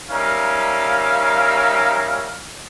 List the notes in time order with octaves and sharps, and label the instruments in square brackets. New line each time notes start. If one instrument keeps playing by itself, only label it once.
[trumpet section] G3 C#4 D#4 A#4 E5 F5